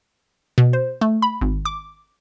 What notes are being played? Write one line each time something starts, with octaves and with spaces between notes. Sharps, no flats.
B2
C5
A3
B5
G#1
D6